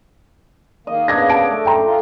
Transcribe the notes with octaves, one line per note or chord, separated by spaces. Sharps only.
D#3 A#3 D#5
C#3 A#3 B3 D4 D#6 G#6 A#6
A5 D7
A3
F#2 G5 A#5 C6
A3 F4